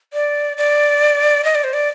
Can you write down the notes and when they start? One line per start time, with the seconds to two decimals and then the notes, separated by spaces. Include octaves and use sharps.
0.13 D5
0.57 D5
1.44 D#5
1.55 D5
1.64 C5
1.73 D5